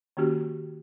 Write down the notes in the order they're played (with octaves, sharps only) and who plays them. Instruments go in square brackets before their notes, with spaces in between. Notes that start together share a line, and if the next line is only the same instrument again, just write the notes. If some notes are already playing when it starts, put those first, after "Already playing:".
[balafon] D#3 A#3 C#4 F#4 G4